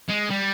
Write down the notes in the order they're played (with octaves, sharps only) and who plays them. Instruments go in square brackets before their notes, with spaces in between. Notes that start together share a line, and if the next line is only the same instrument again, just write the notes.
[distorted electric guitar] G#3
G3